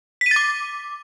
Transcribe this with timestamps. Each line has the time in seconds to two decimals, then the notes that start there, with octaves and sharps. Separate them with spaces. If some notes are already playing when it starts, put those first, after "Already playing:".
0.21 B6
0.26 D#7
0.31 A6
0.36 D6